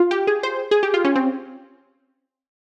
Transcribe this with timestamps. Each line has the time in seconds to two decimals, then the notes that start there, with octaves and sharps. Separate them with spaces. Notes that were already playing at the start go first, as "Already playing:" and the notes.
Already playing: F4
0.11 G4
0.27 G#4
0.43 C5
0.71 G#4
0.83 G4
0.94 F4
1.05 C#4
1.16 C4